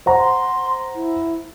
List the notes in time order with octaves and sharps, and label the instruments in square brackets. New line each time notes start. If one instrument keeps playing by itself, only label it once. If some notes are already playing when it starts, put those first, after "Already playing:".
[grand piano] C5 F#5 A#5
[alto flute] C6
E4